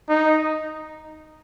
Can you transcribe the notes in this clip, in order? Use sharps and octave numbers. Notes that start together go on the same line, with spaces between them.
D#4